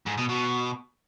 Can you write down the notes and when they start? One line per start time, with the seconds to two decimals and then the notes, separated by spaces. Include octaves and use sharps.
0.06 G#2
0.17 B2
0.29 B2